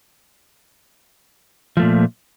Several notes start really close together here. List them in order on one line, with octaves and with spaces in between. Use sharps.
F3 A3 A#2